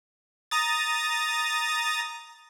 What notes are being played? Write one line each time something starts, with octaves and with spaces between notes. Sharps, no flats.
A#5 D#6 A6